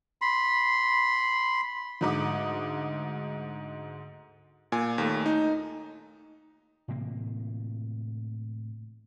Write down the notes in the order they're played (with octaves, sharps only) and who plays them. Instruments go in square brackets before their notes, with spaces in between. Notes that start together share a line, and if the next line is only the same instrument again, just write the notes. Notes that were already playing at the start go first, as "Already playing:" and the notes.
[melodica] B5 C6
[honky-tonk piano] D2 G#2 D6 D#6
[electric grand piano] A#2 G#5
D#2 A3
D#4
[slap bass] A2 C3 E3 A#3